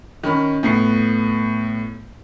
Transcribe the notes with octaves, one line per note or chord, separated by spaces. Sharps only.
D#3 C#4 B5
A2 B3 C7